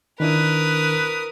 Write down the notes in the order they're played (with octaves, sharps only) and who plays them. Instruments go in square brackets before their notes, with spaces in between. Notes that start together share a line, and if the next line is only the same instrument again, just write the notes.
[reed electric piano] D#3 D4 E4 [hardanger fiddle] A#4 D#6 [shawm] B4